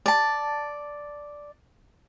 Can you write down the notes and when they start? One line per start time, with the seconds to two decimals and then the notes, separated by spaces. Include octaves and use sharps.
0.06 D5 A5